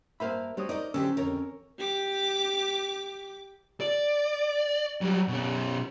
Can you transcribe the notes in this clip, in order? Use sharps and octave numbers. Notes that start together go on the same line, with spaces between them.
G2 A#3 A#4 C5 E5 F5 B5
G3 D4 F#4 C5 C#5 D#6
D#4 A#4 D5 D#5
D3 F#3 C#4 G4 C5 E6
F2 D3 A#4 C#5
G4 D6
D5
F#3 G3
B2 C#4